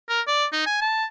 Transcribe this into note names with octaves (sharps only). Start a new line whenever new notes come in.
A#4
D5
D#4
G#5
A5